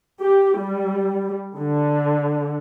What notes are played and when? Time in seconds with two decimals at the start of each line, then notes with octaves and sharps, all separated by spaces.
0.21 G4
0.59 G3
1.57 D3